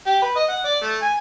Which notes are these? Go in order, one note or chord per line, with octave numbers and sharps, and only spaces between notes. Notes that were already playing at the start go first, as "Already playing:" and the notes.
G4
B4
D#5
F#5
D5
A3
G#5